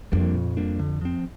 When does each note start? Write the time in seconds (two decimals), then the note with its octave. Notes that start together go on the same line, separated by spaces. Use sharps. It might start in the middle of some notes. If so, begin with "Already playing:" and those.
0.12 F2 G3 A#3 D4
0.34 A#2
0.57 G3 A#3 D4
0.79 D3
1.01 F3 C4